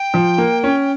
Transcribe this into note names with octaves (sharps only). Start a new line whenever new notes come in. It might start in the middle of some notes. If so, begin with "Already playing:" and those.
Already playing: G5
F3
A#3
C#4